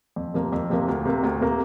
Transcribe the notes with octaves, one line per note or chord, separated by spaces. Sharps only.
F2
C3 F3 A#3
F2
C3 F3 A#3
D2
C3 A#3
D2
C3 A#3